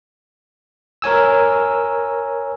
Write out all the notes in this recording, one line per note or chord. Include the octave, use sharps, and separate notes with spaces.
A#4 C#5 G#5 E6